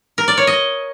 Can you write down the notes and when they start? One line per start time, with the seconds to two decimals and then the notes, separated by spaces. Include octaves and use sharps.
0.18 A#4
0.28 D5
0.37 C#5
0.47 D#5